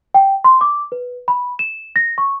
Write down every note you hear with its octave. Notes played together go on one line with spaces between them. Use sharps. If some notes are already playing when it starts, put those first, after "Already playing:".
G5
C6
D6
B4
B5
E7
A#6
C#6